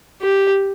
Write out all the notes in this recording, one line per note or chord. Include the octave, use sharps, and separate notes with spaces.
G4